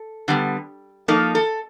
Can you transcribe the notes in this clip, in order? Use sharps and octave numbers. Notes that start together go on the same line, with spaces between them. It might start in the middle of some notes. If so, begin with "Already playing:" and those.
Already playing: A4
D3 G3 B3
F3 A#3 D#4 A4
A4